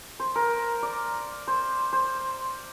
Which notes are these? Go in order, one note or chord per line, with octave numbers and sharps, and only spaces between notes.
C5
A#4
D5
C5
C5